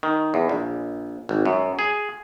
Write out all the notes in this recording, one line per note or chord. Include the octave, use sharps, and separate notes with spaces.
D#3
E2
A#1
G#1
F#2
G#4